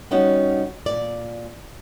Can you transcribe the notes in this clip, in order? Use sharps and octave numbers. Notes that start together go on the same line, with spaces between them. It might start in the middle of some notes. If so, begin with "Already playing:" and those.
G3 B3 C#4 D#4 F#4
A#2 D5